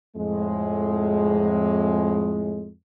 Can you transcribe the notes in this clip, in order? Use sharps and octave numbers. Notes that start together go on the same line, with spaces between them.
F2 A2 G#3